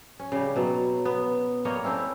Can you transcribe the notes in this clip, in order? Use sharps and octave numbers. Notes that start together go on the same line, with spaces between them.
C#4
C#3 G3
B2 F#3
B3
G3 A#3 C#5 D#5
A3 C4 C#4 E4